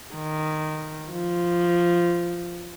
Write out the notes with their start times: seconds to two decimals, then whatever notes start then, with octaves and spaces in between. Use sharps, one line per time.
0.15 D#3
1.12 F3